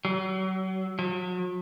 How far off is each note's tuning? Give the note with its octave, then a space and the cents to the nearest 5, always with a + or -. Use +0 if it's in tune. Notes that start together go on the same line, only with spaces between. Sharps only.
F#3 +35
F#3 -40